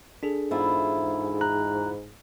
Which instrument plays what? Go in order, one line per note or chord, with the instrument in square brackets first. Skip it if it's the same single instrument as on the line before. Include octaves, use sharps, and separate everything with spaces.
[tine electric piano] D4 G#4 A4
[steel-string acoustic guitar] E2 E4 F4 [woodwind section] G#2
[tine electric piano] A#5 F#6